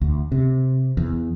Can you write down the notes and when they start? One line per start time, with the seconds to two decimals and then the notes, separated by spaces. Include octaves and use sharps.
0.01 D2
0.32 C3
0.97 E2